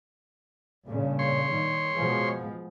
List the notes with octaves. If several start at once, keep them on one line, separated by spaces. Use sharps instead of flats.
G2 A#2 C#3
C#5 C6
D#3
B2 F3 G#3